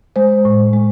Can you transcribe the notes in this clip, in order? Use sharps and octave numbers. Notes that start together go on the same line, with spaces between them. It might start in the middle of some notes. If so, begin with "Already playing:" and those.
G#3 C5
A2
G#3